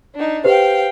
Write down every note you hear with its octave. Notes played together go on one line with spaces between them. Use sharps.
D4 D#4
G4 B4 C5 F5 G5